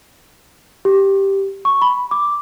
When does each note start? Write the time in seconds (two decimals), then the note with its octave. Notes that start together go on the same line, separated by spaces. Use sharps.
0.85 G4
1.65 C#6
1.82 B5
2.11 D6